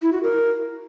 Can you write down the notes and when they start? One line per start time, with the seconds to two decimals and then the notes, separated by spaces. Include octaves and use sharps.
0.02 E4
0.13 F#4
0.23 A#4